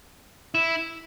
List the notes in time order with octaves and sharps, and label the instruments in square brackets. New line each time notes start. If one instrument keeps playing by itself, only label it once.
[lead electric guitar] E4